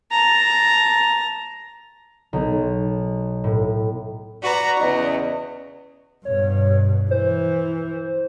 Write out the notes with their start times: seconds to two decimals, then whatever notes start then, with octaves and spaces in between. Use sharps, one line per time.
0.11 A5 A#5
2.33 B1
3.44 A2
4.43 F#4 B4 D5 A#5
4.79 E2 C#3 D#5
6.25 G2 B2 C#5
7.11 E3 C5